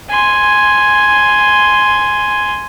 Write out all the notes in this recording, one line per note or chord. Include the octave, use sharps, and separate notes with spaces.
G#5 C6